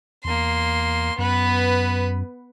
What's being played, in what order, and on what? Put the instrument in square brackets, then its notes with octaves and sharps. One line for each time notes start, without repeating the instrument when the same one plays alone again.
[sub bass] E2 [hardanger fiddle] A#3 C6
[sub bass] F#2 [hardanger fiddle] B3 B4